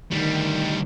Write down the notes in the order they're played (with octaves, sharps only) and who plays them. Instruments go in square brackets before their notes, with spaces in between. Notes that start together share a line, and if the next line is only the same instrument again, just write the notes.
[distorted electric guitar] D2 G3 [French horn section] D#3